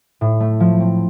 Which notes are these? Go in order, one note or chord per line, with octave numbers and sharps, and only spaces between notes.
A2
A3
F3
C4